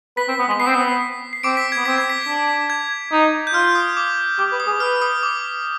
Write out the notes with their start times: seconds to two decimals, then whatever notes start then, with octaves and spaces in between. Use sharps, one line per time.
0.17 B4 B6
0.28 C4
0.39 B3
0.49 G#3
0.51 B6
0.59 B3 C7
0.67 C4
0.75 B3
1.33 C7
1.43 C4 D6 D7
1.57 B6
1.72 G#6
1.77 B3
1.85 C4 B6
1.98 G#6
2.10 B6
2.28 D4
2.70 G#6
3.12 D#4
3.47 G6
3.54 F4 F6
3.75 D#6
3.97 D6
4.39 G4 D6
4.52 B4
4.60 D#6
4.67 G#4
4.80 B4 F6
5.02 D#6
5.23 D6